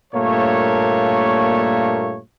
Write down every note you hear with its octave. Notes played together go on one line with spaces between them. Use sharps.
G2 A#2 A3 A#3 C#5